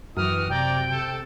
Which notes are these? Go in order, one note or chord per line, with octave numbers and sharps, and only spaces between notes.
F#2 E3 F#4 G4 D#6 F6
C3 D5 G5 A#5
A4